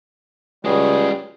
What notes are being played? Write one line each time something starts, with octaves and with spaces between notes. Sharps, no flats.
C#2 G3 G#3 F#4 G#4